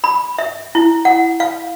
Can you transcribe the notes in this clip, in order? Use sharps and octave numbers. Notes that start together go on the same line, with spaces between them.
B5
E5
E4
F#5
F5